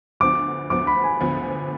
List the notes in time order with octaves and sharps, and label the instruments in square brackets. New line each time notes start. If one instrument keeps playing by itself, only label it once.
[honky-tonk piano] D2 D3 F3 B3 [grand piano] D6
[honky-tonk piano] D2 D3 F3 B3 [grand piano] D6
[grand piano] B5
G#5
[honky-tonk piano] D2 D3 F3 B3